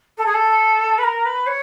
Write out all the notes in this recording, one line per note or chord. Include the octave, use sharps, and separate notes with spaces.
A4
G#4
A4
B4
A#4
B4
C#5